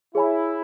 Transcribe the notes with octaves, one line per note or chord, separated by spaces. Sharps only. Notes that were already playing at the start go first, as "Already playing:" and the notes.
E4 G#4 C#5 G#5 B5